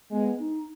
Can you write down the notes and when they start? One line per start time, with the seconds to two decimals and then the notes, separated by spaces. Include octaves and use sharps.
0.11 G#3 B3
0.39 D#4